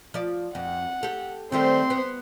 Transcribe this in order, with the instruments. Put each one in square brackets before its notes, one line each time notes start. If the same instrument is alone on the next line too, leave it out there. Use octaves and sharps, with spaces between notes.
[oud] F3 D5
[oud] F2 [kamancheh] F#5
[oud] G4 A4
[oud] D#3 G3 A3 [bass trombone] C4 [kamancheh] C5 C6
[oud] B3